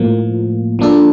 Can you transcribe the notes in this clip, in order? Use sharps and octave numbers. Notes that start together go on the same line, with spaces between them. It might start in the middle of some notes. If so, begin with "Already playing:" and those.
Already playing: A2 F3 A#3
F3 A#3 D4 A4